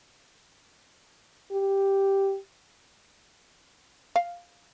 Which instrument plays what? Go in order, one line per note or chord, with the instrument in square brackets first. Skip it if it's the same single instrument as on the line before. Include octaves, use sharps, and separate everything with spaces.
[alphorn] G4
[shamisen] F5